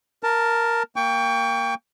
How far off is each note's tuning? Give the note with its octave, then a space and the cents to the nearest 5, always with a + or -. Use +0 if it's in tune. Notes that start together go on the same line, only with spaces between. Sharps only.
A#4 +0 A5 +15
A#3 +0 G5 +20 C#6 +35